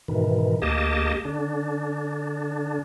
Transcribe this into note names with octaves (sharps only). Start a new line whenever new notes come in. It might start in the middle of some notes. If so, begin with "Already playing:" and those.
G#2 B2 D#3 E3
D2 A#3 G4 G#4 D#5 A5
D3 D4